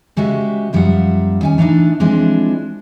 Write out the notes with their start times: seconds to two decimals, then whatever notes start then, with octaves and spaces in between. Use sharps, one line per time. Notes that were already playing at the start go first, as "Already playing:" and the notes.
0.17 C#3 G#3 F#4 G4 B4 E5
0.73 F#2 F3 G3 A#3 E5 F#5
1.41 D#2 C#4 G#5
1.58 E3 A3 B3 D4 D#4
2.00 E3 F3 G#3 C4 D4